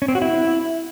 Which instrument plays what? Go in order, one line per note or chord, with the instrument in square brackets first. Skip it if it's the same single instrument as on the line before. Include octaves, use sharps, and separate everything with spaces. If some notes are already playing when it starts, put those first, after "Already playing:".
[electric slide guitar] C#4
C4
F#4
E4